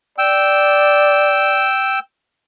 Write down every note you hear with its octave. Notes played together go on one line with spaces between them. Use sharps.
D5 G5 E6